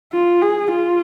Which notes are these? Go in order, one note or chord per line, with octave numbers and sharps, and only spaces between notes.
F4
G#4
F4